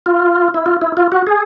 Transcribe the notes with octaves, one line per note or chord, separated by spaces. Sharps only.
F4
E4
F4
E4
F4
F#4
G#4